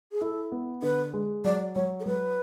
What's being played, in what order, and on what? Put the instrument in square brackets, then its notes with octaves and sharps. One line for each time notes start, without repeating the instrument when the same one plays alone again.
[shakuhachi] G#4
[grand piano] E4 [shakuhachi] A4
[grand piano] B3
[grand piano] D3 [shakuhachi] B4
[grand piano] G#3
[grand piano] F#3 [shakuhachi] D5
[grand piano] F#3 [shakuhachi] C#5
[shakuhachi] A4
[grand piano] F#3 [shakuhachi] B4